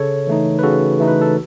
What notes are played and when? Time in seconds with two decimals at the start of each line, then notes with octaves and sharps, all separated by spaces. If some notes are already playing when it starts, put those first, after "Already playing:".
Already playing: C#3 A4 C#5
0.27 E3 A3 D#4
0.59 B4
0.63 C#3 F#4 A4
0.99 E3 A3 D#4
1.08 B4
1.21 A4